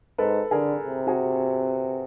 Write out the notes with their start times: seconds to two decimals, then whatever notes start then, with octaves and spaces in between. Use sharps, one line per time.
0.18 G#2 A4 B4
0.51 D3 G#4 A#4
0.85 C3
1.07 F#4 G#4